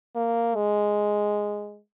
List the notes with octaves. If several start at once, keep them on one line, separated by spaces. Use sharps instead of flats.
A#3
G#3